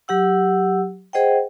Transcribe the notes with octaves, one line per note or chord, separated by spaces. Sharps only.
F#3 G4 F#5 E6
G#4 C5 D#5 F#5 G5